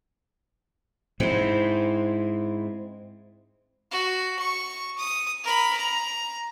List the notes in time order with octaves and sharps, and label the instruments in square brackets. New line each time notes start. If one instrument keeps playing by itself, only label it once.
[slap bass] G#2 [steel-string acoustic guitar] C4 E4
[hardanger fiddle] F#4
C#6
D#6
A#4 B5
A#5